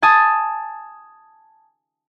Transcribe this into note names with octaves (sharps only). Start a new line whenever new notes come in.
G#5 A5 D#6